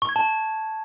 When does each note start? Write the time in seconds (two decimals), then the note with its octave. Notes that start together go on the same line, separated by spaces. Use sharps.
0.02 C#6
0.09 G#6
0.16 A5